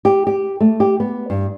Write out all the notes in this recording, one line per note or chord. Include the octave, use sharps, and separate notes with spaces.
G4
G4
A3
G4
B3
G2